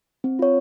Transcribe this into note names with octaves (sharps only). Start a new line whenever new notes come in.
C4
F4 C#5